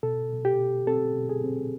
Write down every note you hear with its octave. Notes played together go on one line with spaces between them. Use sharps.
B2 A4
B2
G4
B2
C4 A4
B2
G#4
C4